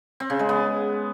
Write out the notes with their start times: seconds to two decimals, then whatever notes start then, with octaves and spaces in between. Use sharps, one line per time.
0.20 C4
0.30 C#3
0.39 G#3
0.49 B3